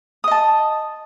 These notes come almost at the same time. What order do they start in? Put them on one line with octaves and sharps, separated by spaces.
D#6 D#5 A5